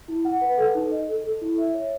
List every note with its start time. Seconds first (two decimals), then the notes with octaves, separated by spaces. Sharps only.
0.08 E4
0.25 F#5
0.41 B4
0.58 A4
0.75 D#4
0.91 D#5
1.08 A4
1.24 A4
1.41 E4
1.58 E5
1.74 C#5